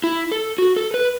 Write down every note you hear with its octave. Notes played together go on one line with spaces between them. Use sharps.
E4
A4
F#4
A4
B4